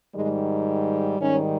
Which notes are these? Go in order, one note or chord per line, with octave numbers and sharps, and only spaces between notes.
G#2 D#3 G3 G#3
G#2 D#3 G3 C#4